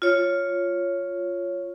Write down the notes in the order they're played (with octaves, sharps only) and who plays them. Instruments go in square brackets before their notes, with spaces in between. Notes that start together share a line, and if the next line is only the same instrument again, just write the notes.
[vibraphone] F4 C#5